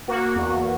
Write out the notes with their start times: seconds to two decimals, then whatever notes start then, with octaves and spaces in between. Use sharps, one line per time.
0.08 A#3 F#4
0.36 E2